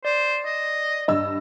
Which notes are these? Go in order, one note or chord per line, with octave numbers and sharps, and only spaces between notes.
C5 D5
D#5
G2 D#5 E6